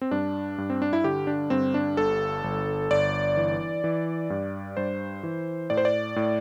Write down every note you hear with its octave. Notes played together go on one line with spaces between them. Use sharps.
C4
G2 D4
G2
C4
D4
E4
D3 G4
D4
G2 C4
D4
G1 A4
G1
G1 D5
E3
E3
G2
G2 C5
E3
A2 D5
C5
D5
A2